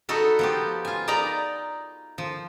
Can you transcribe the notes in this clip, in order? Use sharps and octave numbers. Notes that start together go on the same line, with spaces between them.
D#4 F#4 A4 B4
F3 B3 G4
F4 G#5
D#4 D5 D#5 A#5 B5
F3